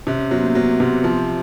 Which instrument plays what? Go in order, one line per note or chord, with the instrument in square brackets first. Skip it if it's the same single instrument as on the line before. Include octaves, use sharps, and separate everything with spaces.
[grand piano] C3 [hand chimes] C#4
[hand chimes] C#4
[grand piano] F#3 [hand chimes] B3
[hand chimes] A#3
[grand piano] F#3 [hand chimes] B3
[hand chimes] C4
[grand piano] C3 [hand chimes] B3
[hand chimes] C4
[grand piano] F3